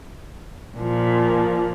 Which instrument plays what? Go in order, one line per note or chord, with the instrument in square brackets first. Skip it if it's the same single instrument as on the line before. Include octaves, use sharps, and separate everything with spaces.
[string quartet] A#2 F3